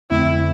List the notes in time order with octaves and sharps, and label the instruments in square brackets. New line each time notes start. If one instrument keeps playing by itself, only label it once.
[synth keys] F2 D3 A3 C4 [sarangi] E4